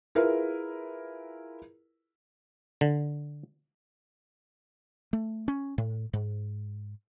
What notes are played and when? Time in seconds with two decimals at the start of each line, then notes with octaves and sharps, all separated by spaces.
0.15 E4 F4 G#4 A#4 B4
2.81 D3
5.13 A3
5.48 C#4
5.78 A2
6.13 G#2